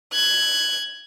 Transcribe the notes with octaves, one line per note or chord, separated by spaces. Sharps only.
F#6 G#6